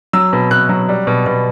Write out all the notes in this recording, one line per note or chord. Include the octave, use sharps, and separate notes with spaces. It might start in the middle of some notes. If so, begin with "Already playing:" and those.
F#3 E6
B2
B2 F#6
F#3
G3
B2
B2